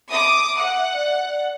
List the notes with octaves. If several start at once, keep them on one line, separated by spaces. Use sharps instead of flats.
E5 D6 D#6
F#5
D5